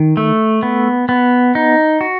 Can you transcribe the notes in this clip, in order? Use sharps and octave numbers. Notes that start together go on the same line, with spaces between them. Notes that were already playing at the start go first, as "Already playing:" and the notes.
Already playing: D#3
A3
B3
B3
D#4
F#4